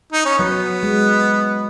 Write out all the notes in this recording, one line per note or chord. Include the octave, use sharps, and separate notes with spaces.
D#4
C#4
F#3 B3
G#3